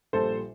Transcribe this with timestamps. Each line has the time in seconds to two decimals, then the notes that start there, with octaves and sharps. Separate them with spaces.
0.13 A#1 A#2 G3 A4 C5